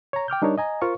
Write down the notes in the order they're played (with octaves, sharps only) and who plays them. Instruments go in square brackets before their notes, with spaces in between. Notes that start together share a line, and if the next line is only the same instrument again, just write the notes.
[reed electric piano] C#5 A#5
G5 D6 F6 G6
G3 D4 D#4 A#4 C#5
D#5 G#5 A#5
F4 A#4 C5 F5 C#6